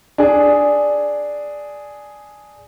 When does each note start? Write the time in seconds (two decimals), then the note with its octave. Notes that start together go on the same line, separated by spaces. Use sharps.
0.18 D4 G#4